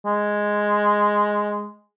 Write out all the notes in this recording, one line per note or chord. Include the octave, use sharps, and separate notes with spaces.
G#3